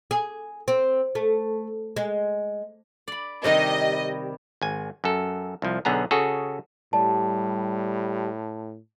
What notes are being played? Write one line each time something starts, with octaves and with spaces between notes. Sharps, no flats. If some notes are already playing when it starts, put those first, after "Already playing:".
G#4
C4
A3
G#3
D5 B5
C3 D#3 G3 D#5
G#1 G#5
F#2 A4
C2 F3
B1 D3 B3 G#4 A#5
C#3 F#4 G#4 A4
A2 G3 A5